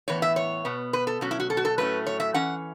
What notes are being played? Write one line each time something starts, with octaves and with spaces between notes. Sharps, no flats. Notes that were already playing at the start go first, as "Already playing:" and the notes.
A2 E3 B3 C#5
E5
C#5
B2 B3
B4
A4
B2 F#3 C#4 F#4
E4
F#4
A4
F#4
A4
A2 F#3 A3 C#4 B4
C#5
E5
E3 C#4 F#5